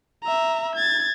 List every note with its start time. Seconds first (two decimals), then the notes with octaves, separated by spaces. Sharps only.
0.23 E5 A#5
0.76 G#6 A6